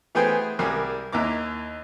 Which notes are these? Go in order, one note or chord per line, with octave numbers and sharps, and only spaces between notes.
E3 A3 B3 G#4 C5 G5
C2 G3 G#4 A#4
D#2 E4 A#5 D6